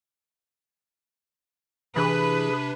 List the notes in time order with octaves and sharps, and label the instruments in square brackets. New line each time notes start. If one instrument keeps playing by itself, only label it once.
[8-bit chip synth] C3 D4 [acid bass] E3 [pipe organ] G#4 [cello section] B4